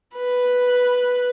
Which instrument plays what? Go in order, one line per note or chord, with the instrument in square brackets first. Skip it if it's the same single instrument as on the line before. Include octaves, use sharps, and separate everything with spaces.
[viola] B4